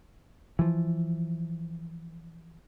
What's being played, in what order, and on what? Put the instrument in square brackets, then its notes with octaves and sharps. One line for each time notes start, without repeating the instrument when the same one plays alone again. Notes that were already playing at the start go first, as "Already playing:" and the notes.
[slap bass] E3 F3